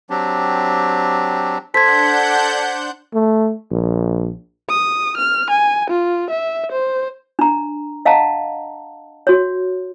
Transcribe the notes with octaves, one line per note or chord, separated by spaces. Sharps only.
F#3 C4 D4 G4
D4 A4 C5 F#5 G6 G#6 B6
A3
A#1
D#6
F6
G#5
F4
E5
C5
D4 A#5
D#5 F5 F#5 A5 A#5
F#4 C#5